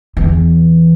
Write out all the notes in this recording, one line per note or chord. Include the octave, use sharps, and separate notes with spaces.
E2 E3